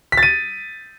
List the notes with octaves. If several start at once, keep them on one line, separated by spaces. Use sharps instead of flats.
B6
A6
D#7